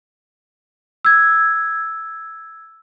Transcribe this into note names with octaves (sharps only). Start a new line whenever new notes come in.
E6 G#6